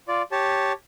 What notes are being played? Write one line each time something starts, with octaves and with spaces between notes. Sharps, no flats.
F4 D5
G4 C#5 A5